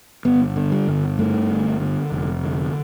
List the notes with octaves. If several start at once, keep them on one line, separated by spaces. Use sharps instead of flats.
G1 B3
D3
G3
G1
G2 A3
G1
D3
F1
D3